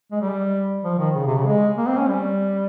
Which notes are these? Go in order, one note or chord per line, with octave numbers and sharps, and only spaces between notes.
G#3
G3
F3
D#3
C#3
C3
C#3
G#3
A#3
C4
C#4
G3